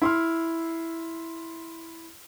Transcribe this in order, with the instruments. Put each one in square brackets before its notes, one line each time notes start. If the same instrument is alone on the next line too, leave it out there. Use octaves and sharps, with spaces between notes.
[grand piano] E4 C6 F6